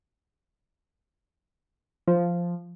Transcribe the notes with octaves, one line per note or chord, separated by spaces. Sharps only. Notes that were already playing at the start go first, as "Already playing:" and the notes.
F3